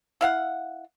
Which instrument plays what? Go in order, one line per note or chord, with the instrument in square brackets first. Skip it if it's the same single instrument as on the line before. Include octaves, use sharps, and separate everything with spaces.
[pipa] E4 F5 F#5